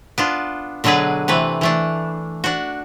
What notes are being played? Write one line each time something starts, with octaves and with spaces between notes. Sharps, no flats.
B3 D4 F4
B2 D3 F#3 D4 G#4 B4
C3 E3 A3 B4
E3 A3 D4
D4 F#4